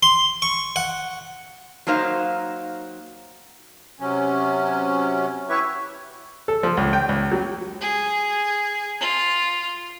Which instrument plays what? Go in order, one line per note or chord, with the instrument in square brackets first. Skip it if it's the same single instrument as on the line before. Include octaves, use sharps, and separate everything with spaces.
[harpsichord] C6
C#6
F#5
[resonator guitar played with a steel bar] F#3 A#3 D#4 C5 F5
[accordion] C3 F#3 C#4
E4 G4 B4 C#5 E5 C#6
[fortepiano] A4
F3
C#2
G5
C#2
F#3
[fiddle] G#4
F4